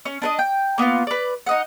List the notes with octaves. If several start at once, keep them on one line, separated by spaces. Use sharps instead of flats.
C#4
D4 B4 D#5
G5
A#3 B3 D4 F4
B4 D5
D#4 D#5 F#5